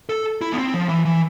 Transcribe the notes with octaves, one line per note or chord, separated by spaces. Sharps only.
A4
E4
B3
C4
F3
E3
E3